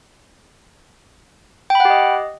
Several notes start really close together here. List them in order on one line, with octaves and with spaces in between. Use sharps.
G5 B5 F#5 G4 D#5